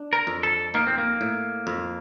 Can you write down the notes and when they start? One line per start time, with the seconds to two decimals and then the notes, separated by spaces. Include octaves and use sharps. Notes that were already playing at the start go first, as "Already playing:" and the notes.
Already playing: D4
0.13 A#4
0.27 F2
0.43 A4
0.74 A#3 D#4
0.87 C4
0.98 A#3
1.21 A2
1.67 F2